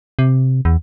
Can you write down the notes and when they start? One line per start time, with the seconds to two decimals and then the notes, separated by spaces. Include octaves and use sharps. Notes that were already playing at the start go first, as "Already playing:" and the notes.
0.19 C3
0.65 E2